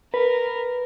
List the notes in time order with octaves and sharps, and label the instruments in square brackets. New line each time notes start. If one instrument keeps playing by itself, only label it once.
[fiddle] A#4 [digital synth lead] B4